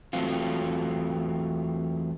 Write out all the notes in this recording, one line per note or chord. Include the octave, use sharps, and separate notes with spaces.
E2 F#3 A3 C4 F4